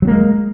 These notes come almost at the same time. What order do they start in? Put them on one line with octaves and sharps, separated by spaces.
F#3 C4 A#3 G#3